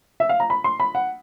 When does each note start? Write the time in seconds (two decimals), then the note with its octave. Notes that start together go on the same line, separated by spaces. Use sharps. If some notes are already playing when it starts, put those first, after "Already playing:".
0.20 E5
0.29 F5
0.40 A#5
0.50 B5
0.64 C6
0.80 B5
0.95 F#5